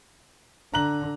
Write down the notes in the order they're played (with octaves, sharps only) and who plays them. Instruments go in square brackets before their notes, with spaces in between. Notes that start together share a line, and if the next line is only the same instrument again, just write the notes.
[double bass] D3 [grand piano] A#5 F#6 F#7